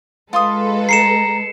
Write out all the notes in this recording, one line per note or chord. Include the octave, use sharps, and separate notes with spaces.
G#3 F4 A4 B4 C6 D#6
A#5 C7 C#7 E7